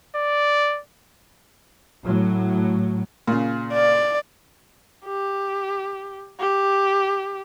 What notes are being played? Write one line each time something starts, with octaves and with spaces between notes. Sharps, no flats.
D5
A2 F#3
A#2 C#3
D5
G4
G4